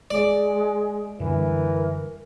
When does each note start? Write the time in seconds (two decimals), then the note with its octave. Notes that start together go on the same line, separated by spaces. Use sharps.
0.11 G#3 D5
1.20 F#2 D3 E3 G3 A#4